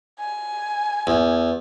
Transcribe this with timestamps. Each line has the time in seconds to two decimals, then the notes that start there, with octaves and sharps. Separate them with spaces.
0.20 G#5
1.07 E2